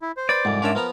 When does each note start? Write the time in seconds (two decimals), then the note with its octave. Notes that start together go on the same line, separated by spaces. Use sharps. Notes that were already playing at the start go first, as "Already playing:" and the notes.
0.02 E4
0.17 C5
0.29 B4 D5 B5
0.45 C2 F2 G#2
0.62 C#4 D4 F4 A#4 E5
0.75 F3 B3 A#4 A#5